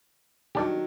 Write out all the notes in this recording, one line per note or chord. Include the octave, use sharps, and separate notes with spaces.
D#3 F#3 G3 D4 G4